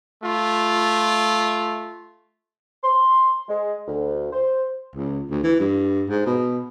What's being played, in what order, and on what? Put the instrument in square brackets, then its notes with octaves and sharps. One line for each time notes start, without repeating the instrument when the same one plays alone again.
[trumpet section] A3 F4
[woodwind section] C6
G#3
D2
C5
[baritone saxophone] C#2
D2
E3
G2
G#2
B2